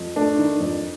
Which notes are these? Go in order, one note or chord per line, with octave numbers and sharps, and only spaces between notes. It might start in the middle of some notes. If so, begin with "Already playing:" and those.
Already playing: F2
A3 D4
D#3
F2